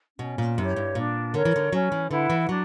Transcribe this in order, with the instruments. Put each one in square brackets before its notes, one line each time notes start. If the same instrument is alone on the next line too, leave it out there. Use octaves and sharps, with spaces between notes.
[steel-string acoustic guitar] B2 [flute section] C#4
[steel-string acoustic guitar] A#2
[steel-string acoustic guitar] F#2 [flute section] E4 G4 C#5
[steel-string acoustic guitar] G2
[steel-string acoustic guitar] A#2 [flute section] D4
[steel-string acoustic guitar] D3 [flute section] A#4 C#5
[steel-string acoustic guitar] E3
D3
[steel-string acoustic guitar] F#3 [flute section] C#4
[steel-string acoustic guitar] E3
[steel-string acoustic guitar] D3 [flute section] E4 B4 F#5
[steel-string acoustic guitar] E3
[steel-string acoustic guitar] F#3 [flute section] D4